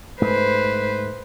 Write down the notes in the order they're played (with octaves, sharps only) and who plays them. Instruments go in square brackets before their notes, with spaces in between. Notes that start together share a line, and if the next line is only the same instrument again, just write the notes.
[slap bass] G#2 A3 [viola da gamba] B4 C5